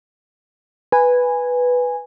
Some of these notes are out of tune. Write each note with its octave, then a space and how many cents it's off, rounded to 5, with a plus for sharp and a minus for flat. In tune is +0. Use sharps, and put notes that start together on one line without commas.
B4 +0 G#5 -10